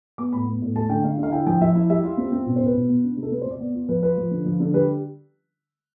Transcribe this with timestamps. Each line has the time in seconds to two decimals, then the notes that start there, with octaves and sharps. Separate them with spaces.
0.18 B3 D6
0.33 A2 B5
0.47 B3
0.62 A2
0.76 A3 A5
0.89 D3 G5
1.04 D3 F5
1.18 D3
1.23 F5
1.32 E4 G5
1.47 F3 G5
1.61 F3 E5
1.75 E4
1.90 G3 E5
2.04 F4
2.18 C4
2.32 C4
2.46 B2
2.56 C5
2.61 B2
2.66 B4
2.74 B2
2.89 B3
3.04 D4
3.17 C3
3.23 A4
3.32 C3 B4
3.41 C5
3.46 C3 D5
3.60 B3
3.75 F4
3.89 F3 B4
4.03 F4 B4
4.18 F3
4.31 D3
4.46 F3
4.60 D3
4.74 G3 B4